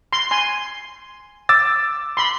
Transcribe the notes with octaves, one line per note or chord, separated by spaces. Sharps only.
C6
G#5 C6
D6 E6 A6
B5 C6